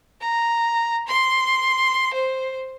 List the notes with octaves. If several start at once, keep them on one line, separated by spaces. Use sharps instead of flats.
A#5
C6
C5